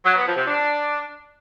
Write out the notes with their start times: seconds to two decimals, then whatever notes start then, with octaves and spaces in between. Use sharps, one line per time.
0.04 F#3
0.15 B3
0.26 F3
0.36 C3
0.47 D4